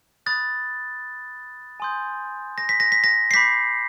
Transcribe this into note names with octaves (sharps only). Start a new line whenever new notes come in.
B5 D#6 F#6 A6
G#5 C6 D#6 G6
A#6
B6
A#6
B6
A#6
C7
B5 D6 G6 B6